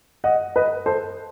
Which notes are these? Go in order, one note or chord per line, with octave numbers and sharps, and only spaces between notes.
D#5 F#5
B4 D#5
A4 C5